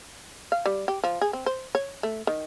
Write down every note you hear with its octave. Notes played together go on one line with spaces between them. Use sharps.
F5
G3
G4
F3
G#4
C4
C5
C#5
A3
D#3